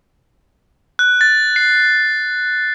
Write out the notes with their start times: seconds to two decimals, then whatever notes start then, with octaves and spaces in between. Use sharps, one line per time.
0.99 F#6
1.21 A6
1.56 C7